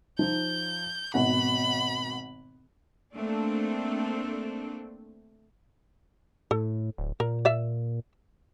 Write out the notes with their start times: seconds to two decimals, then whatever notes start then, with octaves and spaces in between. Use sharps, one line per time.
0.19 F3 D#4 G6
1.14 G#1 B2 F#5 B5
3.14 A3 A#3 C4 D4 A4
6.51 A2 A4
6.98 D1
7.20 A#2 A#4
7.45 D5 E5 F5